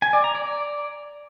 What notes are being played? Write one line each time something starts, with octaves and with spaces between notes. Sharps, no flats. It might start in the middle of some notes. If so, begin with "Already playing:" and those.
G#5
D5
A#5
D5